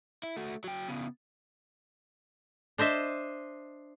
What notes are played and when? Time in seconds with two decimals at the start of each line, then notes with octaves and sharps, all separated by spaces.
0.23 E4
0.37 A3 F#4
0.64 F#3 G5
0.89 C#3 B3
2.78 D4 C5 D#5 E5